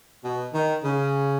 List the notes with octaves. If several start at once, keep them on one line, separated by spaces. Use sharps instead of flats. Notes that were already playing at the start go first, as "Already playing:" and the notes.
B2
D#3
C#3